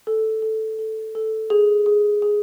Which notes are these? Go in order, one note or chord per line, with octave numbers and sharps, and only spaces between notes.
A4
A4
A4
A4
G#4
G#4
G#4